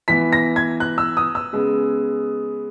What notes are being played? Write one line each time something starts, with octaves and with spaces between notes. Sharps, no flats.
E3 B3 B6
A#6
G#6
F#6
E6
D#6
E6
C#3 G#3 B3